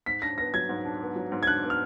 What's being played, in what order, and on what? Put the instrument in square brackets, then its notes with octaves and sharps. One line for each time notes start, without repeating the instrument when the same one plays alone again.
[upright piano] G#2 [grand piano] B6
[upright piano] D4 [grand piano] A#6
[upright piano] B3 [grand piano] A#6
[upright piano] F#3 [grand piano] G#6
[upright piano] G#2
D4
B3
F#3
G#2
[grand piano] G#6
[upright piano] D4 [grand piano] F#6
[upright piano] B3
[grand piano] F6